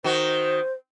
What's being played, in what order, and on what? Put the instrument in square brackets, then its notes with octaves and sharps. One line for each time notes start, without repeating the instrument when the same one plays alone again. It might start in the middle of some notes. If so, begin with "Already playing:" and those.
[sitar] D#3 F#4 [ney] C5